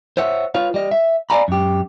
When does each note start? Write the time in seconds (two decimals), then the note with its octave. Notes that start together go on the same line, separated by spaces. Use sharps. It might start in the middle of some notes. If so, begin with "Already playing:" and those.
0.17 C5 C#5 E5 F#5
0.54 F4 B4 C#5 F5
0.74 G3 D#5
0.91 E5
1.30 D5 D#5 F5 G#5 A#5 B5
1.48 F#2 G4